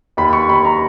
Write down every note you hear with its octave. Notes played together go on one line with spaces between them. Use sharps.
D#2 B5
C#6
D#2 B5
A#5